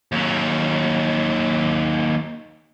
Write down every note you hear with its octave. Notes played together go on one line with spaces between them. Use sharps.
D#2 F#3